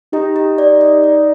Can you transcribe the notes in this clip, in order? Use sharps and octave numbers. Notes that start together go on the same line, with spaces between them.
D#4 G4
G4
D5
D5
D5